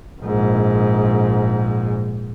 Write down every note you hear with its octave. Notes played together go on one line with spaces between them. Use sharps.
A#1 G#2